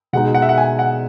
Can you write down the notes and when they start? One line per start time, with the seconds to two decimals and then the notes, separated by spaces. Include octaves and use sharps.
0.13 B2 G#3 D#4 F#5
0.35 F#5
0.42 E5
0.49 F#5
0.58 G#5
0.79 F#5